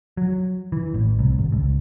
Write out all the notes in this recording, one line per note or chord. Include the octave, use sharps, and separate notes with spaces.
F#3
E3
A1
C2
G#1
C#2